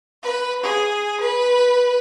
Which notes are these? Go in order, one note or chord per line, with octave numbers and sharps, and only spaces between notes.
B4
G#4
B4